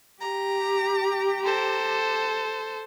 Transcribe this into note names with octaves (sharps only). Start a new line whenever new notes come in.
G4 A#5
A4 C5